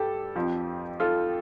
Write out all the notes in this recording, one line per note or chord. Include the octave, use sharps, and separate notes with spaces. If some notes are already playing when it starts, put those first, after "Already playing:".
Already playing: G2 G4 A4
F2 F3
F4 A4